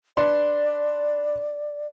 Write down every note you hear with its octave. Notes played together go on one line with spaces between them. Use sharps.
D4 B4 D5 C6